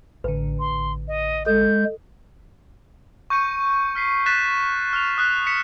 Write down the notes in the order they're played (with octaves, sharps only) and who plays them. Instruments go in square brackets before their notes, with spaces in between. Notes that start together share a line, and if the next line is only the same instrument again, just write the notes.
[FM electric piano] A1 D3 [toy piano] B4
[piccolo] C6
D#5
[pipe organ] G#3 [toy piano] A4 [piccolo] G6
[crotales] C#6 G6 C#7 D#7
F6 B6 C7
F#6 A6 B6 D#7 E7
F6 F7
D#6 F#6 B6
B6 C#7 E7